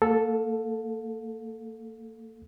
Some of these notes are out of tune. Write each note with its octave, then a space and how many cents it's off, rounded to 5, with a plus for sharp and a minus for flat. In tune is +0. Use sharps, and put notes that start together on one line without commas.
A#3 -40 A4 +0 F5 +25